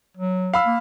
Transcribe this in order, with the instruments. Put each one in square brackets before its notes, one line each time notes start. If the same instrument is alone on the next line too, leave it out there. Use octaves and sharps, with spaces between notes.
[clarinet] F#3
[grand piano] F5 B5 E6
[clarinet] A#3